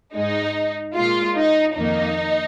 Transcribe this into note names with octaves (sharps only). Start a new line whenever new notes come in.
G#2 G#3 D#4
A#2 G#3 F4
D#4
F2 D#3 A#3 D#4